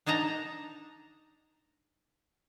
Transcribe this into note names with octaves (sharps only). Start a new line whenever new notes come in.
D4 D#4 D#5 A5 A#5